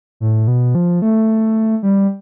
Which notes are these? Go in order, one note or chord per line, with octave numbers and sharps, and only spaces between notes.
A2
B2
F3
A3
G3